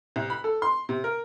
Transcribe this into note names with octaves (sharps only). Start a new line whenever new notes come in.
C2
B5
A4
C6
C3
A#4